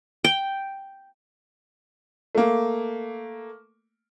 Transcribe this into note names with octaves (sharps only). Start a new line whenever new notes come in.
G5
A3 A#3